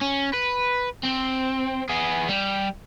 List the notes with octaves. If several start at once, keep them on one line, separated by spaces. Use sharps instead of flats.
C#4
B4
C4
B3 G#4
G3